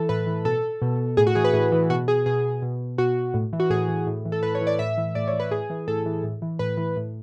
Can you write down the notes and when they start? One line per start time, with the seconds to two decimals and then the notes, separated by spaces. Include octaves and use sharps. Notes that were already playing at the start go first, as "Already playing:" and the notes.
Already playing: E3 A4
0.09 A2 B4
0.27 E3
0.45 B2 A4
0.82 B2
1.17 A2 G#4
1.27 F#4
1.35 E3 G#4
1.44 B4
1.53 A2 G#4
1.72 E3
1.90 B2 F#4
2.08 G#4
2.26 B2 G#4
2.62 B2
2.98 B2 F#4
3.34 A2
3.53 E3
3.60 F#4
3.70 A2 G#4
3.88 E3
4.07 A2
4.25 E3
4.32 A4
4.43 A2 B4
4.55 C#5
4.61 E3
4.67 D5
4.79 A2 E5
4.98 E3
5.15 A2 D5
5.28 C#5
5.33 E3
5.40 B4
5.51 A2 G#4
5.70 E3
5.88 A2 A4
6.06 E3
6.24 A2
6.42 E3
6.59 A2 B4
6.77 E3
6.97 A2